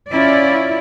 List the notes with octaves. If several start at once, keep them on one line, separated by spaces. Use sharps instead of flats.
C#4 E4 F4 D5